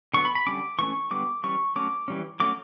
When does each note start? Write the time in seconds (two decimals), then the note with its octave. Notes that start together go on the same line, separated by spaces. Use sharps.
0.14 D3 F#3 B3 C#6
0.25 B5
0.35 B5
0.47 D3 G3 C#4 D6
0.79 E3 A3 C#4 C#6
1.11 D3 G3 B3 D6
1.43 E3 G3 C#4 C#6
1.76 F#3 A3 C#4 D6
2.08 E3 G3 C#4
2.40 F#3 A3 C#4 D6